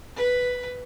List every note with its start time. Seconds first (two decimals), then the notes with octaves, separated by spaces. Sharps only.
0.16 B4